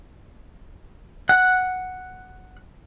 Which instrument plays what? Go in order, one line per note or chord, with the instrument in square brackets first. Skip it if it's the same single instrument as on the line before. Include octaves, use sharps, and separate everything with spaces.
[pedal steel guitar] F#5 F#6